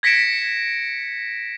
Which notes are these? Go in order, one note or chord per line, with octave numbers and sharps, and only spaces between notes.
G#6 A#6 B6 C#7 D7 E7